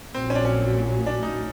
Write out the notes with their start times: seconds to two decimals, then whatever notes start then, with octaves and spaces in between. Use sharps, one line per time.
0.14 A#1 A#2 F#3 C4
0.30 C#4
0.35 D4
0.45 C#4
1.06 D4
1.23 D#4